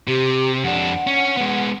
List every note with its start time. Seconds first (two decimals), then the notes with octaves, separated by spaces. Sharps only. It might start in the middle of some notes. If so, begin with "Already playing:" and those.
0.07 C3 G4
0.64 F2 D4 F#5
1.07 C#4
1.37 G#3 B3